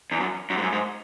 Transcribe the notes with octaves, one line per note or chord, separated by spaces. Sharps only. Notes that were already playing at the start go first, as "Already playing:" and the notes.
E2
F#2
F#2
G#2
F#2
G#2